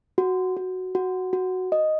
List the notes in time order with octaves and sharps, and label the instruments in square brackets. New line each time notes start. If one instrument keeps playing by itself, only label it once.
[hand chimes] F#4
F#4
F#4
F#4
D#5